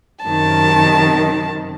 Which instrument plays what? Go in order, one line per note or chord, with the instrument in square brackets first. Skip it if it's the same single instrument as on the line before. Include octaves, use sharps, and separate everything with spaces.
[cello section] F#2 C3 D#3 [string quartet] A5